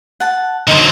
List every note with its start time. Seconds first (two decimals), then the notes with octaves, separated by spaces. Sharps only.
0.20 F#5 A5
0.68 D3 F#3 D#4 A#4 C5